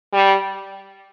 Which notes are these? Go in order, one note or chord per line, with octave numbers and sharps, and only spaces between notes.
G3